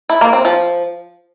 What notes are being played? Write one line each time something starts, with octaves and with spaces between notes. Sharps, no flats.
E4
A#3
C4
F3